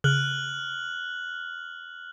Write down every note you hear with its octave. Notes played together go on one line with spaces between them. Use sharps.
C#3 F6 F#6 F#7